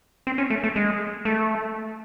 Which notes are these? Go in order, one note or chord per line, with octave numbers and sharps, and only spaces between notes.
C4
C#4
A3
A3
G#3
A3